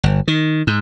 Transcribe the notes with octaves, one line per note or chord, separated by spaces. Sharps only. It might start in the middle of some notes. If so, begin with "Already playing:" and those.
G1
D#3
G#2